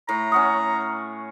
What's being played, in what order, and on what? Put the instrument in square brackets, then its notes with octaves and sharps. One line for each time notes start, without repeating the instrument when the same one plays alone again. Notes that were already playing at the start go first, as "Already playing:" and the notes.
[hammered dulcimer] A2 [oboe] A#5
[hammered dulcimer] C#4 F#5 C#6 [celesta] D#6